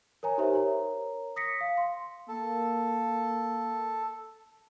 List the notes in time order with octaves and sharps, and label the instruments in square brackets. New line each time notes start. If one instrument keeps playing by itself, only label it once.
[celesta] A#4 C#5 G#5 A#5
D#4 G4 A#4 C5 C#5 E5
A#4 C#5 A#5
D#6 A#6 B6 C#7
F5
C6
[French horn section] A#3 [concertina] A4